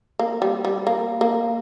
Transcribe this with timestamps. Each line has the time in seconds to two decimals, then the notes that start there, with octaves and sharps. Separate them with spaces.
0.19 A#3
0.42 G3
0.65 G3
0.87 A#3
1.21 A#3